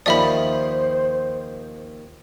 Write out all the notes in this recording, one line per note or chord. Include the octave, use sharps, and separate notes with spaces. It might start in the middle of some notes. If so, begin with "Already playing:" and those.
D#2 F3 C5 D5 E5 B5 D#6